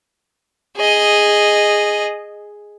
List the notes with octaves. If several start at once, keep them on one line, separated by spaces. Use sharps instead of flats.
G#4 D#5